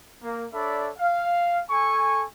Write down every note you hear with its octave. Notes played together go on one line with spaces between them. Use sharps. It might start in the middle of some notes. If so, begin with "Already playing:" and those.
A#3
D4 A4 C#5 D5 E5 B5
F5
A4 G#5 C#6